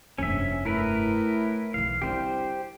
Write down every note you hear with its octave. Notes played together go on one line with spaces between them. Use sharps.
F1 A#1 G2 C#4 E5
A2 E4 A#4 B4
B1 E2 F5
C2 D3 G4 C5